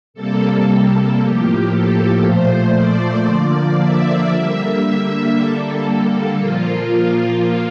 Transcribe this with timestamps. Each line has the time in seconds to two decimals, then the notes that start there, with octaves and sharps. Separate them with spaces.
0.14 C3 G3 A#3 A4
0.65 A4
1.18 A2 F3 A#3 G4
1.70 A4
2.22 A#2 F3 A3 C5
2.74 D5
3.25 D3 F3 A#3 D5
3.78 E5
4.30 D3 G3 A#3
5.34 D3 G3 A#3 A4
6.38 A#2 F3 A#3 F4